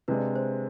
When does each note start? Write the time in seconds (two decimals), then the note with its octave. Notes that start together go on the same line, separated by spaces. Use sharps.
0.08 C3 G#3 D4 B4
0.36 C5